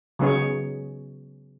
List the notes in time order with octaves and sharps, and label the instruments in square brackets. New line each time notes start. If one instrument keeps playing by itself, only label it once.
[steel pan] C#3 F#3 B3 D#4 G#4 C#5